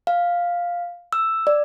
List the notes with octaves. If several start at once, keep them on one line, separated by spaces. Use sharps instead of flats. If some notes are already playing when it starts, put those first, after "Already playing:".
F5
E6
D5